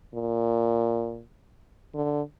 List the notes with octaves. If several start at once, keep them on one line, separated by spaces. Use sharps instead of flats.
A#2
D3